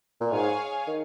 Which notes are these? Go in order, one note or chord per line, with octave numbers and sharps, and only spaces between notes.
A#2
G#2 G#4 C#5 F5 G#5
D#3